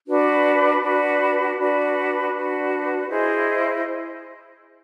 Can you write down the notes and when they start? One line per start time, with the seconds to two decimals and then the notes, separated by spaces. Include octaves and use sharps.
0.05 D4 F#4 B4
0.81 D4 F#4 B4
1.57 D4 F#4 B4
2.32 D4 F#4 B4
3.08 E4 G#4 C5 D#5